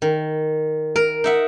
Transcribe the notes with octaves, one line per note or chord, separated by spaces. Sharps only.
D#3
A#4
D#4 E5 F#5